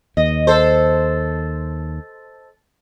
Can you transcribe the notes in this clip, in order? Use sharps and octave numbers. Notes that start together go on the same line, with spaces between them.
D#2 D#5
A4 C5